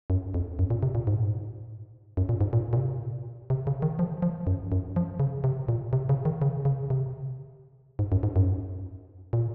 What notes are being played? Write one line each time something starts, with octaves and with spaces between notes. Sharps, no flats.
F#2
F2
F#2
A#2
C3
A#2
G#2
A#2
G#2
F#2
A#2
G#2
A#2
A#2
C3
C3
C#3
D#3
F3
F3
F#2
F#2
F3
C#3
C3
A#2
C3
C#3
D#3
C#3
C#3
C3
G#2
F#2
G#2
F#2
A#2